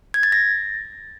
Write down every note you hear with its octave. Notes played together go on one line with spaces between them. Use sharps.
G#6
A6
A#6